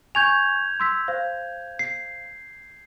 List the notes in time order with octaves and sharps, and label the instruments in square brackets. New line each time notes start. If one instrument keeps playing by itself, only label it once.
[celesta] G#5 C#6 [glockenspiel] G6 G#6 F7
[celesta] C6 E6 B6
C5 F5
[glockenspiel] C7